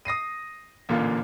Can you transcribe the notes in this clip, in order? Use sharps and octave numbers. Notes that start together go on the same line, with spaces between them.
D#6 A#6 C7 D#7
A1 A#2 D3 A#3 F4